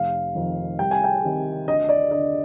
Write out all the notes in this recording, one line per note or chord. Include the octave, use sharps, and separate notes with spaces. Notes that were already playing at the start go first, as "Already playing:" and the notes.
Already playing: F1 F5
F2 D#3
C2 G5
G#5
G5
C3 D#3
D2 D#5
D5
D3 D#5